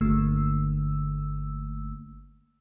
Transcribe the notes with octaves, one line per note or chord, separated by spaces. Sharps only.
G1 D3 A3 A#3 E6